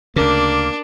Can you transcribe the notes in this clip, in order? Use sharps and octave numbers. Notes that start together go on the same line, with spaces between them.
D2 C#3 A#3 D4 A#4